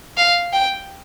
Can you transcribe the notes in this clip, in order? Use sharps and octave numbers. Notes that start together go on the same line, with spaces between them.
F5
G5